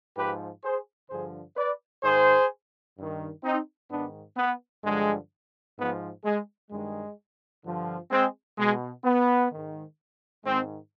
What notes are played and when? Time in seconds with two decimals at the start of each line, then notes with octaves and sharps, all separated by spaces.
0.17 G#2 F3 G4 B4
0.63 G#4 C5
1.10 G2 D3 F3 G#4 C5
1.57 B4 D5
2.04 G#2 D#3 G#4 C5
2.97 G2 D#3
3.44 C4 D#4
3.90 G#2 D#3 B3 D4
4.37 B3
4.84 G2 D3 F3 G#3
5.77 G#2 F3 B3
6.24 G#3
6.71 G2 D#3 G#3
7.65 G2 D3 F3
8.11 G#3 C4
8.58 B2 G#3
9.04 B3
9.51 G#2 D#3
10.45 G#2 D#3 G#3 C4